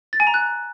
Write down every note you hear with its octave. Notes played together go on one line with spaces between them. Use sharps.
A6
G#5
A#5
F#6